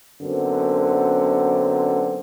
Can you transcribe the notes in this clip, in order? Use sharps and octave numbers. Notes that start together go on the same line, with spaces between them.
F#2 D3 B3 C4